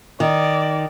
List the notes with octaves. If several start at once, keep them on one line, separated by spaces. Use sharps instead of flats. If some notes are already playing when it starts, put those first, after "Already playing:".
D#3 D5